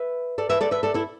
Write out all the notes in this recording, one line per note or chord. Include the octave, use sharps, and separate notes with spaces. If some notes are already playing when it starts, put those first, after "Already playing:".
Already playing: B4 E5
A4 D5
B4 E5
A4 D5
B4 E5
A4 D5
E4 A4